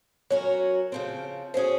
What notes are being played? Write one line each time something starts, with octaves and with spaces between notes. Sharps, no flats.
F#3 C#4 F#4 A#4 C#5
C#3 F3 C4
C#3 F#3 C#4 G#4 C5